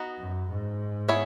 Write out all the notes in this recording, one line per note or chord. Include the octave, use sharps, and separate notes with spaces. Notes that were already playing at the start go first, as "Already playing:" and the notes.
Already playing: B3 D#4 F#4
F#2
G#2
B3 E4 G#4 C#5